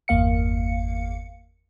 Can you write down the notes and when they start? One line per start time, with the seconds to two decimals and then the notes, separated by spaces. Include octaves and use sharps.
0.08 G1 E2 A#3 F5 C#7